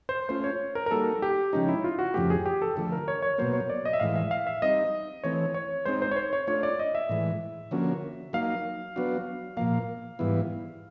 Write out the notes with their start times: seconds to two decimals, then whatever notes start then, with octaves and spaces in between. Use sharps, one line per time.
0.09 C5
0.29 A3 C#4 F4 C5
0.44 C#5
0.75 A#4
0.86 A#4
0.91 G3 A#3 D#4 F#4 A4
1.22 G4
1.53 C#3 F3 G#3 C#4 D#4
1.68 E4
1.84 F4
1.99 F#4
2.14 F2 C#3 F3 A3 G4
2.30 G#4
2.46 G4
2.62 A4
2.76 D3 F3 A3 A4
2.92 A#4
3.08 C#5
3.22 C#5
3.38 B2 F#3 A#3 C5
3.53 C#5
3.70 D5
3.85 D#5
3.93 E5
4.00 A2 E3 G#3 F5
4.16 E5
4.31 F5
4.47 E5
4.62 G3 C4 D#4 D#5
5.24 E3 A3 C4 C#5
5.54 C#5
5.86 G#3 C4 D#4 C5
6.02 C5
6.11 C#5
6.16 C5
6.33 C#5
6.47 A3 D4 F4 C#5
6.63 D5
6.79 D#5
6.95 E5
7.09 A2 E3 G#3
7.71 D3 F3 A#3 C#4 F#4
8.33 F#3 A#3 D#4 F5
8.96 F#3 B3 D4 F#4
9.57 A#2 F3 A#3 F5
10.19 G#2 E3 G3 B3 E4